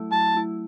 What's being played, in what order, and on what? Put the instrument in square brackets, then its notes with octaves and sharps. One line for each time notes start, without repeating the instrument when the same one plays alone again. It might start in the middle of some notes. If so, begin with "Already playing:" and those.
Already playing: [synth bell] F#3 A3 E4
[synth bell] F#3 [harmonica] A5
[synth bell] A3 E4